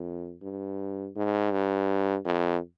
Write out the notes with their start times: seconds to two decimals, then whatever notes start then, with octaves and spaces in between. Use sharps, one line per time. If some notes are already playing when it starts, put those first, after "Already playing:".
Already playing: F2
0.42 G2
1.16 G#2
1.52 G2
2.25 F2